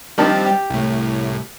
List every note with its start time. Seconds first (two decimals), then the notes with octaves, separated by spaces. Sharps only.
0.18 D#3 F3 G3 C4 D4
0.45 G4
0.70 C2 A2